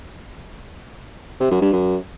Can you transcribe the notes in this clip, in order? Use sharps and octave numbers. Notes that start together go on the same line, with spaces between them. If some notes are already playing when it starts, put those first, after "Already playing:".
C3
F#2
G2
F#2